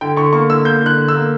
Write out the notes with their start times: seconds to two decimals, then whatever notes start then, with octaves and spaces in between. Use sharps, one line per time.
0.01 D3 G5
0.16 D3 C#6
0.33 A#3 C#6
0.50 D3 E6
0.65 A#3 G6
0.81 D3 F#6
0.97 D3
1.08 E6
1.14 A#3